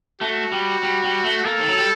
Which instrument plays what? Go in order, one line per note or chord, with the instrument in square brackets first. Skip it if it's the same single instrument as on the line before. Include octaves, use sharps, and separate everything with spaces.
[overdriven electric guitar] A3 [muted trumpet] F#4
[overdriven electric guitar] G3
G3
G3
A3
[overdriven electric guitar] A#3 [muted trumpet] A4
[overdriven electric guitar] D#3
F#3
G3